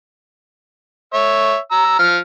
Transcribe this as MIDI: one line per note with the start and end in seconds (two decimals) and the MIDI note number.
1.14 1.56 73
1.14 1.56 76
1.71 1.98 82
1.71 1.98 88
1.99 2.17 53
1.99 2.17 89